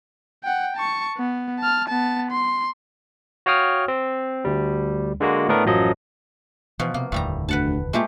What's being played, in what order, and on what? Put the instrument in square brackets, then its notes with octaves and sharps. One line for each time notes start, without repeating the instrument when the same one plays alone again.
[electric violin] F#5 G5
A5 C#6
B3
A5 F6
B3 A5
C6
[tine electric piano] F#4 C#5 F5 G5 D#6 F6
C4
D2 G3
D3 G#3 A#3 F#4
A2 A3 B3 D4 A#4
A1 F#2 F3 F#3 D#5
[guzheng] B2 F3 [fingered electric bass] E3
[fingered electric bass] C3 [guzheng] A#3
[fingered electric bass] F1 D#2 D3 [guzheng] A2 G3 A#5
[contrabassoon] D2 [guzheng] B4 F#5 A5
[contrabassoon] A#2 [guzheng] G#3 A3 G4